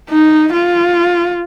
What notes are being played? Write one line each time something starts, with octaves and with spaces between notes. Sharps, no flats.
D#4
F4